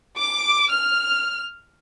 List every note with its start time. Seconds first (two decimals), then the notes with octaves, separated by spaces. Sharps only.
0.19 D6
0.70 F6